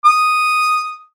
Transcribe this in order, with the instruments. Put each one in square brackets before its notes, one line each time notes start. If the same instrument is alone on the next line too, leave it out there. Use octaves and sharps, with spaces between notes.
[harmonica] D#6